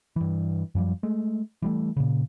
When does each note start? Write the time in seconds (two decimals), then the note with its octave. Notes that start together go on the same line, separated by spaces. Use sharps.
0.16 G2 E3
0.75 F#2 F3 G3
1.03 G#3 A3
1.62 E3 G3 A3
1.97 A#2 C#3